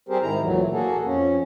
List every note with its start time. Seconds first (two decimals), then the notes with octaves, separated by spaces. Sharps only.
0.09 G3 C4 G4 G#4 A#4 C5
0.22 G#2 D#3 E4 A#5
0.41 D2 A#2 E3 F#3 A3
0.72 A#3 F#4 G#4 A4
1.06 F2 C#4